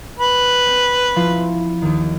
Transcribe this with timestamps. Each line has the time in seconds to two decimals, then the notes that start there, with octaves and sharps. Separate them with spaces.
0.19 B4
0.67 C4
1.16 F3 E4 F4
1.82 D#2 D#3